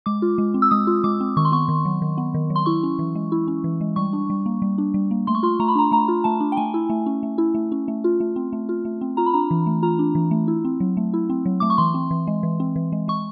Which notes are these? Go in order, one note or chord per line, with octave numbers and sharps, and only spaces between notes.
G#3 D6
F4
G#3
C4
E6
G#3 D#6
F4
G#3 D6
C4
D#3 C#6
C6
B3 C#6
D#3
F#3
D#3
B3
D#3
F#3
C6
E4 C#6
C#4
E3
G#3
E4
C#4
E3
G#3
G3 C#6
D4
G3
A#3
G3
D4
G3
A#3
A3 C6
C#6
F4 C6
A3 A#5
B5
D4 A#5
A3 A#5
F4
A3 A5
D4
G5
A3 G#5
E4
A3
C#4
A3
E4
A3
C#4
A3
F4
A3
C4
A3
F4
A3
C4
F4 A#5
B5
D4 A#5
E3
A3
F4 A#5
D4
E3
A3
E4
C4
F#3
A3
E4
C4
F#3
A3 D6
C#6
E3 C6
C4
E3
G#3
E3
C4
E3
G#3
G#3 C#6